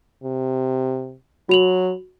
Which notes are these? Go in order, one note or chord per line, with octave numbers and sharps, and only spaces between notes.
C3
F#3 F#4 F7 F#7